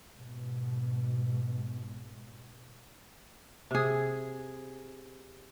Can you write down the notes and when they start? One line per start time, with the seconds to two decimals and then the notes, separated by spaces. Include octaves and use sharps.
0.13 G#2 B2
3.71 C3 G#4